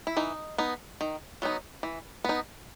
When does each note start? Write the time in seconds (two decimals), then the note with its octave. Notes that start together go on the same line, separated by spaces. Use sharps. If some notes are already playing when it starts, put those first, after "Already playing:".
0.07 E4
0.17 E3 D#4
0.58 B3 D#4
1.01 D#3
1.42 F#3 B3 D#4
1.83 E3
2.24 B3 D#4